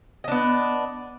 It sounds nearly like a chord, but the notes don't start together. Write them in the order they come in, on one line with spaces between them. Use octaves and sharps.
D#5 D4 B3